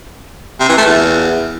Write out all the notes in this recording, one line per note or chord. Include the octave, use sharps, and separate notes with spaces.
C3
E3
A3
E2